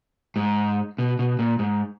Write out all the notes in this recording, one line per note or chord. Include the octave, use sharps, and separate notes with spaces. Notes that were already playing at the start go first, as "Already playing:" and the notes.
G#2
B2
B2
A#2
G#2